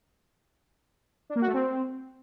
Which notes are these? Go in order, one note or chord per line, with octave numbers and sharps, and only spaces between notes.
D4
A#3
F#4
A3
C4